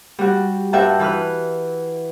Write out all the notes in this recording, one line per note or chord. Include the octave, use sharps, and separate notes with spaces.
G3 F#4
G2 F#4 E5 G5 A5
E3 B4 F6 F#6